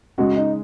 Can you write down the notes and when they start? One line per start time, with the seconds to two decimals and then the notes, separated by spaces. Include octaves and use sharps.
0.18 C#3 G#3 C#4 F#4
0.36 D#4